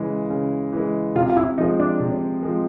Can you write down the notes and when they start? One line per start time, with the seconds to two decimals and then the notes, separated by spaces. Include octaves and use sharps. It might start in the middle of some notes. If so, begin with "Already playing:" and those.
Already playing: C#3 E3 G#3
0.30 C#3
0.73 E3 G#3
1.15 C3 F4
1.30 F4
1.37 E4
1.58 F3 G#3 D#4
1.80 D4
2.00 C3
2.43 F3 G#3